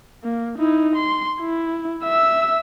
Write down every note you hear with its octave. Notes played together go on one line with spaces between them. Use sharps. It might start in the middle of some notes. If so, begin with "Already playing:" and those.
A#3
D#4 E4
C6
E4
E5 E6